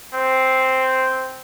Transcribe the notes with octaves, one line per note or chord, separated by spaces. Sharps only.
C4